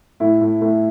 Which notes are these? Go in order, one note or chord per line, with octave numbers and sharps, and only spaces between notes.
A2 E4
A2
A2